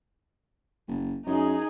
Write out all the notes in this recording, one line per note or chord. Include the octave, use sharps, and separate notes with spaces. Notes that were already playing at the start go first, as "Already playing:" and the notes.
F#1
F#2 D#4 G#4